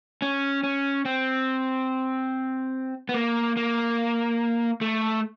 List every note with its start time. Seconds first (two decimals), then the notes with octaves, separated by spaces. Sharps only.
0.22 C#4
0.64 C#4
1.05 C4
3.09 B3
3.14 A#3
3.57 A#3
4.81 A3